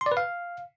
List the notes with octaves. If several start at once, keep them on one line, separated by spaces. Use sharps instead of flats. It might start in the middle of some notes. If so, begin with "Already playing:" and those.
C6
D5
B4
F5